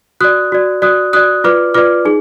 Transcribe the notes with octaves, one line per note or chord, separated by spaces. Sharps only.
F#4 D5 D#6 F#6
F#4 D5
F#4 D5 D#6 F#6
F#4 D5 D#6 F#6
F4 B4 D5 D6 F6
F4 B4 D5 D6 F6
D#4 G#4